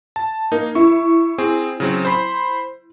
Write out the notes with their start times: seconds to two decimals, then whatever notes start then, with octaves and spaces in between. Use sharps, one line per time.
0.16 A5
0.52 A#3 D#4
0.75 E4 C#6
1.38 C4 G#4
1.80 C#3 F#3 C4
2.05 C5 B5 C6